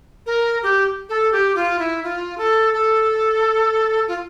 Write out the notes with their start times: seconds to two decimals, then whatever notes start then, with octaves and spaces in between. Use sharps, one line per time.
0.26 A#4
0.63 G4
1.09 A4
1.32 G4
1.56 F4
1.79 E4
2.04 F4
2.38 A4
2.73 A4
4.08 F4